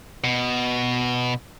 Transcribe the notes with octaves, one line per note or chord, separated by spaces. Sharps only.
B2